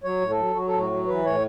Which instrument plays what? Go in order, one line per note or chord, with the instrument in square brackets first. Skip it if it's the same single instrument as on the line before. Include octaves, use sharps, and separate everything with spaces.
[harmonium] F#3 C#5
A2
A4
F#3
F#3 F#4
A4
A2
F#4
F#3
E3 B4
A2 C#5